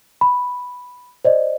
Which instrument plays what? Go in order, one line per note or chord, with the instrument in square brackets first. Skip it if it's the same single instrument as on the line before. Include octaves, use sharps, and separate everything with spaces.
[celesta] B5
C5 D5 D#5